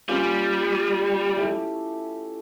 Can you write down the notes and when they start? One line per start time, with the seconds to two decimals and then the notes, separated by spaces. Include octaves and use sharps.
0.09 G3 A#3 C#4 F4
1.37 A3 E4 G4 C#5